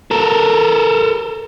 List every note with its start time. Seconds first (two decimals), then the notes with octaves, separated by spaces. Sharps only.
0.11 A4 A#4